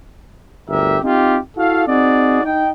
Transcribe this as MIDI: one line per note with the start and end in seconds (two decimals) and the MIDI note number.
0.69 0.98 31
0.69 0.98 38
0.69 0.98 67
0.69 0.98 70
0.69 0.98 76
1.03 1.38 60
1.03 1.38 63
1.03 1.38 65
1.03 1.38 67
1.58 1.84 64
1.58 1.84 66
1.58 1.84 69
1.58 1.84 77
1.88 2.42 60
1.88 2.42 63
1.88 2.42 66
1.88 2.42 68
1.88 2.42 74
2.44 2.70 63
2.44 2.70 79